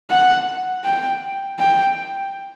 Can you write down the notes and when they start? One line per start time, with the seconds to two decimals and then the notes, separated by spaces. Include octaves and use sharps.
0.10 F#5
0.84 G5
1.59 G5